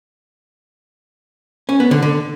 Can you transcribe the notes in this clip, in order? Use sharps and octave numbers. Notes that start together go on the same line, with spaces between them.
C#4
B3
D3
D3